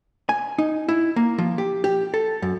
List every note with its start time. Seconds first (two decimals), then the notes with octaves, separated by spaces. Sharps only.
0.29 G#5
0.59 D#4
0.89 E4
1.16 A#3
1.38 F3
1.58 G4
1.84 G4
2.14 A4
2.42 F#2